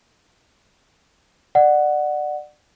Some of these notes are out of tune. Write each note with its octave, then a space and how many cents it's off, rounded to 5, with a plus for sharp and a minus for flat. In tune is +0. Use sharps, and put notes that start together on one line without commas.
D5 +25 F#5 +0